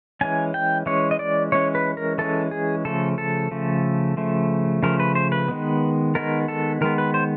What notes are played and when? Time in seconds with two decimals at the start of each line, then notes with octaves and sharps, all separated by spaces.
0.21 E3 G#3 C#4 G#5
0.54 G5
0.86 E3 G#3 C#4 C#5
1.11 D#5
1.19 D5
1.52 E3 G#3 C#4 C#5
1.75 B4
1.97 A#4
2.18 E3 G#3 C#4 A4
2.51 G#4
2.85 C#3 F3 A3 A4
3.18 A4
3.51 C#3 F3 A3
4.17 C#3 F3 A3
4.83 C#3 F3 A3 A#4
5.00 B4
5.15 C5
5.32 B4
5.48 D#3 G#3 B3
6.15 D#3 G#3 B3 A#4
6.48 A4
6.81 D#3 G#3 B3 A#4
6.98 B4
7.14 C5